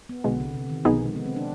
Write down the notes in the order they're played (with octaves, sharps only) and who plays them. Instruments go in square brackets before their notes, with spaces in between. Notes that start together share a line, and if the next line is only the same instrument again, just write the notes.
[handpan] B3
[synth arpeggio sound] B1 B2 G#3 [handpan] D3
[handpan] C3
C3
D#3
[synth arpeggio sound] B1 B2 B3 D#4 G#4 [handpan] F3
[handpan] G#3
B3
C4
D4